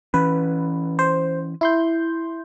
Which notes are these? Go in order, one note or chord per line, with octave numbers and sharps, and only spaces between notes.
E3 C#4 B4
C5
E4 C6 G6